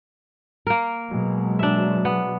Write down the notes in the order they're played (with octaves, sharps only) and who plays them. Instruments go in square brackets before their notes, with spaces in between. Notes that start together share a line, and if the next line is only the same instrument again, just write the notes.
[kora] A#3 A#4
[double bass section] B2 F#3 G#3
[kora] D4 E5
B3